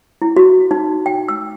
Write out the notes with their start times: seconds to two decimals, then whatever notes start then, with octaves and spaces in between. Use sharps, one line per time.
0.22 E4
0.36 F#4
0.71 D#4
1.06 G5
1.28 E6